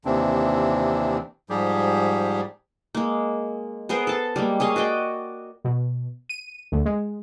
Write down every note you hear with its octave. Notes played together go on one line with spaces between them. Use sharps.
D#2 C3 E3 C4 D4
G#2 F3 G3 G4 G#4
G#3 A#3
B3 G#4 A#4 C5
A4 A5
G3 G#3 A#3
G#4 C#5 D#5 F5
F#4 D5 D#5 G5
B2
D#7
D2
G#3